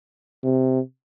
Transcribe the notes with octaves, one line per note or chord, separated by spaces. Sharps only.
C3